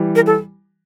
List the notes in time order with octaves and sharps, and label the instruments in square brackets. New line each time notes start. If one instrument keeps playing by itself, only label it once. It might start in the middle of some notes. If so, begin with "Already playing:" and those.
Already playing: [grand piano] E3 G3
[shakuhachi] A#4
A4